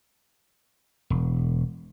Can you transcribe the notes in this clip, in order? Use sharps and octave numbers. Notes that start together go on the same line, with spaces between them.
E1